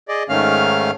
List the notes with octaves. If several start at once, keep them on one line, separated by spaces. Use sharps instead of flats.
G#4 D5 D#5
G#2 D#3 A3 C#4 F5 F6